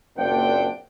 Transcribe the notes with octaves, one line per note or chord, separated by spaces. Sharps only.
F#1 A#2 C4 D4 F#5 G5